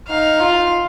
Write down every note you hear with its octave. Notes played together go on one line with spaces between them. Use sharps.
D#4 F5
F4